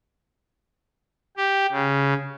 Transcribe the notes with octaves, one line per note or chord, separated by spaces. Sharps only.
G4
C#3